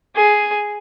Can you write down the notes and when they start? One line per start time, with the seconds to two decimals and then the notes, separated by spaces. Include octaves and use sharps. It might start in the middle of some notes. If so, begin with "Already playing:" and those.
0.16 G#4